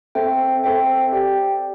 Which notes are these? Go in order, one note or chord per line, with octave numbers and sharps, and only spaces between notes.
C4 A4 C5 E5 G5
C4 A4 C5 E5 G5
G4 D5 G5